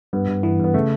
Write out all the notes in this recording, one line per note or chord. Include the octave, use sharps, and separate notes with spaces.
G2 B3
G2
E3 B3
G2 B3
C#3 A3